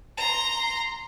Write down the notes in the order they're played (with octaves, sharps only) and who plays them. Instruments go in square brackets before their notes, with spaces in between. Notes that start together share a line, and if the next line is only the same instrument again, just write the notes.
[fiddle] A#5 C6